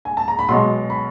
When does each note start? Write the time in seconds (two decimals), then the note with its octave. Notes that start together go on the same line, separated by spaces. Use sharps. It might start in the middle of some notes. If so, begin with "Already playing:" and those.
0.05 G#5
0.17 A5
0.28 A#5
0.39 B5
0.48 B1 B2 G#3 C6
0.90 B5